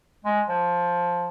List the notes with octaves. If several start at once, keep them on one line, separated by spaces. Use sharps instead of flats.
G#3
F3